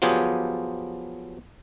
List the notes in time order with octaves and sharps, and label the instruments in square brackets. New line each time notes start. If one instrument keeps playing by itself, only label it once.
[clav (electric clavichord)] F3 F#3 B3 F4 G4 G#4